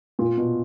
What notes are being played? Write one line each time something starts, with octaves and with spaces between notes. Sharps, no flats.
A#2 F4
B2